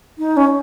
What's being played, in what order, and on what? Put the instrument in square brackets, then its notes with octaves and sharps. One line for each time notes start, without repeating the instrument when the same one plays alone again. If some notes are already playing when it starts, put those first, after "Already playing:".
[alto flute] D#4
C#4